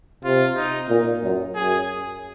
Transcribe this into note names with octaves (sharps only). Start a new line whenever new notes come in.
C3 F4
D#4
A#2
F#2
F#2 G#4